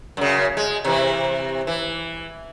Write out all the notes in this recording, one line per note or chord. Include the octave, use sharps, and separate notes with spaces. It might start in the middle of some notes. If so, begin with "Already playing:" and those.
F#2 C#3
G#3
C3 E3
E3